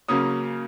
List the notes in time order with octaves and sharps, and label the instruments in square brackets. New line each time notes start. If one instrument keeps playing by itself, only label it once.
[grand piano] C#3 F#3 A#3 C#4 D#6